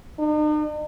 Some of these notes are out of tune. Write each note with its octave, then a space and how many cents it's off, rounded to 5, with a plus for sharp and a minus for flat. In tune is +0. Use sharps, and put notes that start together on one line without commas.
D#4 -45